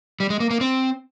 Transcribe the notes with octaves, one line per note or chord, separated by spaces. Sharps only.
G3
G#3
A#3
A#3
C4